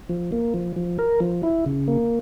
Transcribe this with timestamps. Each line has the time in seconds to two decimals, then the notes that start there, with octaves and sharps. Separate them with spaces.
0.09 F3
0.32 A#3
0.54 F3
0.76 F3
0.99 A#4
1.20 F3
1.43 E4
1.66 C#3
1.88 A#3